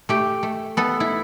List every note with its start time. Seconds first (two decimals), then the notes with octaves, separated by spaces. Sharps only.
0.09 A3 G4
0.43 A3
0.77 B3 A4
1.00 E4